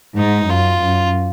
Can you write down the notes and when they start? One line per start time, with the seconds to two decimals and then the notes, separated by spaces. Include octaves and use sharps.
0.18 G#2 D#4
0.50 F#2 F4
0.82 F#2